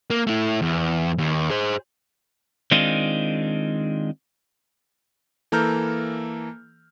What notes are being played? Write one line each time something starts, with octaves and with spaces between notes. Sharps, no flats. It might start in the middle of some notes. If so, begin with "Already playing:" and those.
A#3
A3 E4
E2
D#2
G#4 C5
D#3 G#3 C4 D4 D#4 F4
E3 A#3 A4 A#5 F6 G6